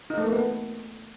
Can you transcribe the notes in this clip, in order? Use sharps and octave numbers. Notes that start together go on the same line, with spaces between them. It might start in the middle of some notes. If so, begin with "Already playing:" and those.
D#4
A3
A#3
B3